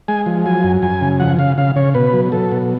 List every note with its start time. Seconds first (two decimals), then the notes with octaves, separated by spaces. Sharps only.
0.08 G#3 G#5
0.26 F3
0.46 F#3 G#5
0.64 F#2
0.82 F#2 G#5
1.01 C#3
1.20 F3 F#5
1.39 C#3 F5
1.58 C#3 F5
1.76 C#3 C#5
1.95 B2 B4
2.13 F#3
2.32 F#3 A4
2.52 B2